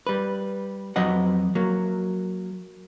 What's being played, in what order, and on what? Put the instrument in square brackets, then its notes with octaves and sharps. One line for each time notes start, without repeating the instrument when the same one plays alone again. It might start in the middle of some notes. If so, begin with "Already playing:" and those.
[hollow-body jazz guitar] G3 B4
F2 F#3 B4 D#5 F#5
F#3 A#3